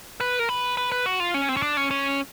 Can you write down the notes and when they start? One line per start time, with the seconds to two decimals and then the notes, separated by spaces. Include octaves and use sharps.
0.20 B4
0.39 A#4
0.49 B4
0.77 B4
0.92 B4
1.06 F#4
1.20 F4
1.34 C#4
1.49 C4
1.57 C#4
1.62 D4
1.77 C#4
1.91 C#4